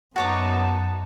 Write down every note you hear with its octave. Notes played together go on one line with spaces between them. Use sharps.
F#2 B3 D#4 F#4 C#5 A5 D6